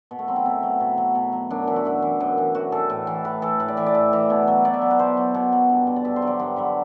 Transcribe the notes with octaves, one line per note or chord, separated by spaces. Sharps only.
B2
A3
F#3 C4
E4
B2 C4
F#3
B2
F#3
B2
F#3
F#2 D4
E3 E4
F#4
F#2 E4
E3
F#2
E3
F#2 F#4
E3 A4
A2
E3
A2 B4
E3 A4
A2 B4
D5
E3 E5
D5
A2 E5
E3
B2
F#3
B2 D5
E5
F#3
B4
B2 C5
F#3
B2
F#3
G2
D3 F#3
D5
G2 E5
C5
D3 F#3
D5
G2
D3 F#3 B4